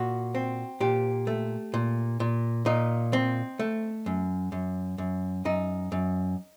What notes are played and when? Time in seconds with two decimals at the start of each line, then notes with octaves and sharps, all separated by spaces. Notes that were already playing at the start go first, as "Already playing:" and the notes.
Already playing: A#2 F#4
0.35 C4
0.80 A#2 G4
1.27 A3
1.74 A#2
2.20 A#2
2.66 A#2 D#4
3.13 C4
3.59 A3
4.06 F#2
4.52 F#2
4.98 F#2
5.45 F#2 D#4
5.92 F#2